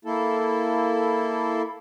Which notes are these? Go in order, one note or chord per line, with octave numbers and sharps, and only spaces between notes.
A#3 E4 A4